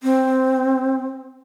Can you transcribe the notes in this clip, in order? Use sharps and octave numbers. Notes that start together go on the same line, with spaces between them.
C4